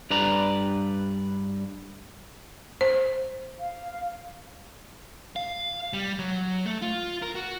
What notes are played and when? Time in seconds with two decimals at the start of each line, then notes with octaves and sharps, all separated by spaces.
0.10 G2 B4 D5 A#5
2.81 C5
3.60 F5
5.36 F5
5.93 G3
6.19 F#3
6.65 A3
6.82 F4
7.22 A#4
7.35 F#4